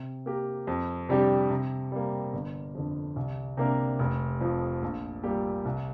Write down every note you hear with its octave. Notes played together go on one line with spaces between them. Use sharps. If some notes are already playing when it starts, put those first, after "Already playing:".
Already playing: C3
A#3 G4 A#4
F2
C3 G3 D4 G4
C3
G3 A#3
G1
F2 D3
C2
C3 A#3 D4 A#4
F1
F2 F3
A#1
A#2 G3 A#3 G4
C2